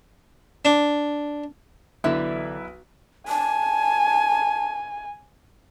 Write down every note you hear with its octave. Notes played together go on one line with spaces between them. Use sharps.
D4
B1 D3 E3 E4 B4 E5
G#5 A5